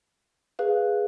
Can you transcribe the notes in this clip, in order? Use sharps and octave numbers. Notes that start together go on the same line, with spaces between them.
G#4 B4 F5